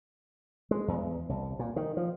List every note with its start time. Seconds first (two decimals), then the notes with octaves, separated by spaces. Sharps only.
0.71 G#3
0.88 E2
1.29 C2
1.59 A#2
1.76 D#3
1.97 F3